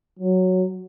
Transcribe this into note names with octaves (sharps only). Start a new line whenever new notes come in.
F#3